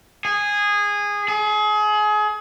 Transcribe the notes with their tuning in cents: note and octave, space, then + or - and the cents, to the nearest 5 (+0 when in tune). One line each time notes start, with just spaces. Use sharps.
G#4 -15
G#4 +30